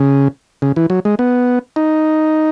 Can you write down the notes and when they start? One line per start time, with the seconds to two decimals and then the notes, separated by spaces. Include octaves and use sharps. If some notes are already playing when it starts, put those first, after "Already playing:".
Already playing: C#3
0.62 C#3
0.76 E3
0.90 F#3
1.05 G#3
1.19 B3
1.76 D#4